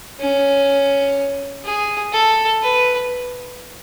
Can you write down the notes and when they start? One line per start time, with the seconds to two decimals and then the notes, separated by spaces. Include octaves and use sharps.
0.20 C#4
1.65 G#4
2.13 A4
2.62 B4